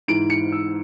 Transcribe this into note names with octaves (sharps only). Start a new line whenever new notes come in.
G#2 E3 D7
C#7
E6